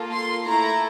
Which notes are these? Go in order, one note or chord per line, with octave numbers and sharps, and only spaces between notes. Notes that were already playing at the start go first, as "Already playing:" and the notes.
Already playing: A#3 F4 A4
C6
A3 E4 A4 A#5